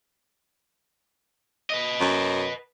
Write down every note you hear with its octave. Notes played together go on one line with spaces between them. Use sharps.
B4 D#5
F#2